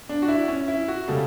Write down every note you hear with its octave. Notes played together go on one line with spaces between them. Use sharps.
D4
F#4
E4
C#4
E4
F#4
C#3 G3 A4